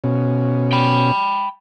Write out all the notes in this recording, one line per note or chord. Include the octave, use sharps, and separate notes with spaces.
B2 C#4
G5 B5